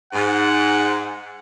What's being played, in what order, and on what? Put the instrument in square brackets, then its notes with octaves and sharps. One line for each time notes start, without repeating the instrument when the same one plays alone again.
[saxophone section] G#2 [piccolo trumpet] F#5